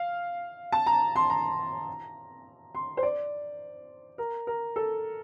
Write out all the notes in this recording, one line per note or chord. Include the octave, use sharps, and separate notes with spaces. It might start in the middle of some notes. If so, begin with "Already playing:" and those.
Already playing: F5
A5
A#5
C6
A#5
C6
C5
D5
A#4
A#4
A4